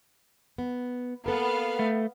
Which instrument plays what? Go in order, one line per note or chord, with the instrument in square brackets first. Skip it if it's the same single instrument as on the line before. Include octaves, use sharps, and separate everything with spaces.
[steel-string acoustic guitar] B3
[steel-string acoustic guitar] A#3 A4 A#4 [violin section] B3 F5
[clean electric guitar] A3